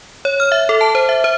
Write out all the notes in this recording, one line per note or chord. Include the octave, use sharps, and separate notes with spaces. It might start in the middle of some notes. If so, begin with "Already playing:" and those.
C#5
F6
E5
A4
A5
C5
E5
C5